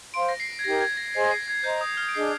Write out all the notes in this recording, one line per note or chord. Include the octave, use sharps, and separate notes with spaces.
C5 F5 C6 D7
A#6
C7
G#6
D#4 G4 A#4 A#6
G#6
A#6
G#4 C5 D#5 G#5 C7
A#6
C7
G#6
C5 D#5 A#5 G6
D#6
F6
D7
D4 G#4 D#5 C7